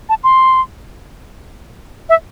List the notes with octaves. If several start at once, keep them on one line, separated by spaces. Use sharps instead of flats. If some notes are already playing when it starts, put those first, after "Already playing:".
A5
C6
E5